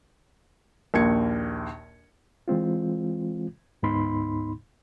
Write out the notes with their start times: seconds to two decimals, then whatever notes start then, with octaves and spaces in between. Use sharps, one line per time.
0.94 A#1 D#2 G#6 C#7
2.48 E3 G#3 C4 F4
3.83 D2 G#2 B3 D#4 B5 C6